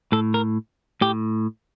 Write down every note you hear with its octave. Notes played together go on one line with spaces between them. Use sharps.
A2 A4
A#4
A2 G4